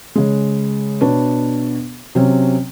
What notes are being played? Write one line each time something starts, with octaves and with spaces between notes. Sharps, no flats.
C#3 G#3
B2 D4 B4 C#5
C3 F#3 C4 C#4